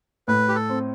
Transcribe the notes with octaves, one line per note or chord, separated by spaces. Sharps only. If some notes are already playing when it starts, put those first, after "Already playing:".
A2 B4
G4
A4
C4